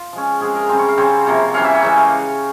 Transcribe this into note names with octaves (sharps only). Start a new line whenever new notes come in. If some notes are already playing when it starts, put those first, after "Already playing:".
Already playing: F4
F3 G#3 C#4
F3 G#3 C4 G#4
A#4
C#3 G3 C4 C5
C#5
F5
C#3 G3 C4 C#5
C3 F3 A#3
E3 G3 A#3 C#4 F5
E5
C#5
C#3 E3 G#3 G5
F5